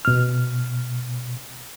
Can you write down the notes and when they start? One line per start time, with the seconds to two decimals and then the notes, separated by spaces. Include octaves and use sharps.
0.05 B2 F6